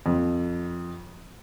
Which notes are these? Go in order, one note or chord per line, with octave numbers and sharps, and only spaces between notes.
F2